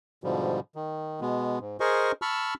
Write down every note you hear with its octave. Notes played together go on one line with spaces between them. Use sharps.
G#2 B2 D3 F3 G3
D#3
B2 G#3 B3
G#2
G#4 A#4 C5 D#5 G#5 C#6
A5 B5 C#6 E6 F6